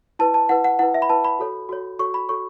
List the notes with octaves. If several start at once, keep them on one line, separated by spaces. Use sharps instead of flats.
E4 B4 A5
A5
E4 B4 F#5
F#5
E4 B4 F#5
E5
B5
E4 B4 A5
B5
F#4 A4 C#5
F#4 A4 C#5
F#4 A4 C#5 C#6
B5
F#4 A4 C#5 C#6